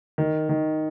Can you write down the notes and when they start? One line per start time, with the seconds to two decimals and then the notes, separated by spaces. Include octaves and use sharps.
0.18 D#3
0.49 D#3